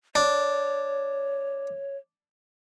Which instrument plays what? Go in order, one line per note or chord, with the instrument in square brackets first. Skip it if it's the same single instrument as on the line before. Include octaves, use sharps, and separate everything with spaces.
[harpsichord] D4 [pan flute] C#5